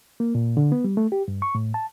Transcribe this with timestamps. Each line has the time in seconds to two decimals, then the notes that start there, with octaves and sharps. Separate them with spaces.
0.20 A#3
0.35 A#2
0.57 D3
0.72 B3
0.84 G3
0.97 A3
1.12 G4
1.28 G2
1.42 C#6
1.55 A2
1.74 A5